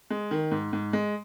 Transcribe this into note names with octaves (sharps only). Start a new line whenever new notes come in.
G#3
D#3
G#2
G#2
G#3